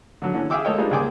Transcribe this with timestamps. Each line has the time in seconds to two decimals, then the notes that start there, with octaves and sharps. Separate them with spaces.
0.22 D3 F#3
0.34 D3 E3 C#4
0.50 G#4 E5 F5 G5 D6 E6
0.64 G#3 A#3 A4 C#5 D#5 G5
0.78 F3 G3 G#3 A#3 D4 D#4
0.91 C#2 A#3 G#4 G5 G#5 D6